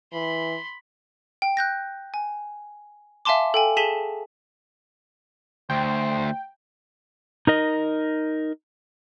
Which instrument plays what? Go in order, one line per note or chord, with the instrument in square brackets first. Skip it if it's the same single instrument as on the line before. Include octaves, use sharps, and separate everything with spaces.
[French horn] E3 [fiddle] B5 C6
[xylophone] G5
F#6 G6 A#6
G#5
E5 F5 G#5 A5 C6 D6
A4 G5 G#5
G#4 A5 B6 D#7 E7 G7
[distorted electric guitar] D2 [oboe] C5 [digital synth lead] G5
[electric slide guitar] D#4 A#4 D#5